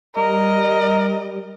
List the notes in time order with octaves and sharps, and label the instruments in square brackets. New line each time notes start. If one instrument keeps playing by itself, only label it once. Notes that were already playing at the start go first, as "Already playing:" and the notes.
[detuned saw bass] G3 [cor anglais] A#4 [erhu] D#5